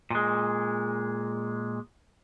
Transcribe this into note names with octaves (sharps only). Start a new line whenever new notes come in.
A#2 G#3